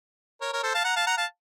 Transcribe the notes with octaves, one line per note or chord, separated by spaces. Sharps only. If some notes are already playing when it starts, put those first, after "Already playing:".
A#4 C#5
A#4 C#5
A4 C5
F5 A5
F#5 A#5
F5 A5
F#5 A#5
F5 A5